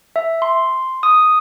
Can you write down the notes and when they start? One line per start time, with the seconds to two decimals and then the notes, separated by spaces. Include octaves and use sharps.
0.16 E5
0.42 C6
1.03 D#6